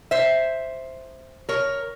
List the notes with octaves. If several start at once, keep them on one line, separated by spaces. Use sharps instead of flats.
C5 E5
A#4 C#5